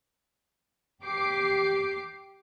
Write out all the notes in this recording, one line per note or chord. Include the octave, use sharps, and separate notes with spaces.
G4 D6 C7